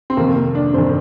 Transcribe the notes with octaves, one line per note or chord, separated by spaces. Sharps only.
C4
F2 C3 D#3 A#3
A#3
D4
F2 C3 D#3 C5